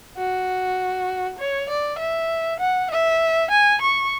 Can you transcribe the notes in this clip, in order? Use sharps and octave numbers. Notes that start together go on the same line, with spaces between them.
F#4
C#5
D5
E5
F#5
E5
G#5
C#6